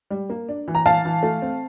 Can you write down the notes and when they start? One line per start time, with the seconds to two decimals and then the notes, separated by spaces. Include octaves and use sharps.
0.10 G3
0.30 A#3
0.49 D4
0.68 E3
0.75 A#5
0.86 E3 F5 A5
1.05 E3
1.23 A3
1.42 C4